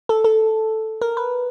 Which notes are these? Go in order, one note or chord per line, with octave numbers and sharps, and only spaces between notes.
A4
A4
A#4
B4